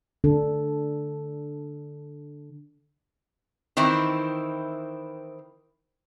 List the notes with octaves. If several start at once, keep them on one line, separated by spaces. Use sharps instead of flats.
D3 D4 A4
D#3 E3 C4 E4